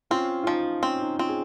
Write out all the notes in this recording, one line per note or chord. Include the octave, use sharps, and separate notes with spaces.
C4 C#4 F4
F4
F3 D#4
C4 C#4
D#4
C4 C#4 F4
G#4